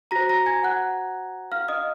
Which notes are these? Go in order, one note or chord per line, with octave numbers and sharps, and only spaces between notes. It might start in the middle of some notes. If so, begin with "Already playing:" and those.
F#4 C5 A#5 A#6
A#5 A#6
G#5 G#6
F#5 F#6
F5 F6
D#5 D#6